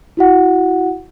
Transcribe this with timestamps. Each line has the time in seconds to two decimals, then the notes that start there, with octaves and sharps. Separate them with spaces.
0.17 E4 F#4 F#5